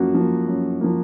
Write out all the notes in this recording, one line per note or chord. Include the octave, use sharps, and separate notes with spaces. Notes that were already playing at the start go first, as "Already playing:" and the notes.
Already playing: F#2 F3 A#3 F#4
F3 A#3
F#2
F3 A#3